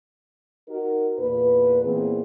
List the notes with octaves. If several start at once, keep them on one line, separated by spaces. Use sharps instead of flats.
D#4 F#4 A#4
E2 A#2 B4
A#2 E3 B3 C4 G#4